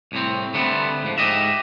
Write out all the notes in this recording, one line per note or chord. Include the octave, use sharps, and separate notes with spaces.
C2 A2 C4
D3 G3 A3 B3 C4
G#2 F3
G#2 G4 D#5 E5